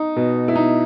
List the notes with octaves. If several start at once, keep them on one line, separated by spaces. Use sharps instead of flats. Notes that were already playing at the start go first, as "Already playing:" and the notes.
Already playing: D#4
B2
E4
D#4